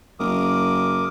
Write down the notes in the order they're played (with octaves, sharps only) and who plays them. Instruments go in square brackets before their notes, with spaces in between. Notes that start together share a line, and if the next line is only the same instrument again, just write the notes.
[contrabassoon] F#1 [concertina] A#4 D6 D#6